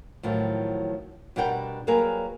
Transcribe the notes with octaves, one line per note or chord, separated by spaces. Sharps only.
A2 D#3 F3 F#3
B2 G3 D4 A#4 F#5 G5
F#3 G3 A#3 G#4 A#4 B4